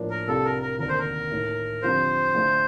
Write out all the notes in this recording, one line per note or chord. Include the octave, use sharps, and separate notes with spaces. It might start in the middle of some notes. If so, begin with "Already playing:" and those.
Already playing: A2 F3 A#3 D4
A#4
C2 C3 G3 D4 F4 A4
A#4
A#4
D2 C3 D#3 A#3 D4 A#4
C5
A#4
A2 A3 D#4
F2 D3 G3 C4 F4 C5
D3 A3 D4 F4